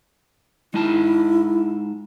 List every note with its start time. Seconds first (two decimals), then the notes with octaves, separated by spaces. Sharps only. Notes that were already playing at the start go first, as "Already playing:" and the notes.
0.74 G#3 D#4 E4 A5